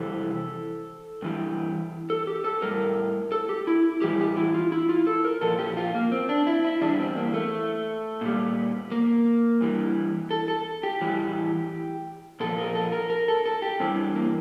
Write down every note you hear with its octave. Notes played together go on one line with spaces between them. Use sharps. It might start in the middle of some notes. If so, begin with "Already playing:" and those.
Already playing: F2 C3 E3 G3 A4
G2 E3 G3
A4
G4
A4
A2 G3 A#4
A4
G4
E4
A2 E3 G3 G4
G4
E4
F4
E4
F4
A4
A#4
A#2 F3 A4
G4
F4
A#3
C4
D4
E4
E4
E2 E3 G3 D4
C4
A#3
A3
A#2 G3
A#3
G2 E3 G3
A4
A4
G4
A2 E3 G3
A#2 F3 A4
A#4
A4
A#4
A#4
A4
A4
G4
G2 E3 G3 C4
A#3